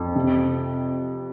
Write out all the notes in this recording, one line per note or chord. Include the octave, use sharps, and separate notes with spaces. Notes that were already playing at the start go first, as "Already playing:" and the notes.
Already playing: F2
C3